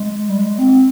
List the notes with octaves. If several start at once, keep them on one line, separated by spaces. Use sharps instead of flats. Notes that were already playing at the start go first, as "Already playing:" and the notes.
Already playing: G#3
G3
G#3
C4